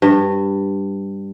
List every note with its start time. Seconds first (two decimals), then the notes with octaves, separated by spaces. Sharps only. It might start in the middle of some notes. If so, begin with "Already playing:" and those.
0.02 G2